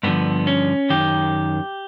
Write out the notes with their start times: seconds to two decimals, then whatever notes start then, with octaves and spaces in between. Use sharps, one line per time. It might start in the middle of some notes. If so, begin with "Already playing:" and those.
0.03 G2 D3 F3 B3
0.47 C#4
0.90 F#2 D#3 G4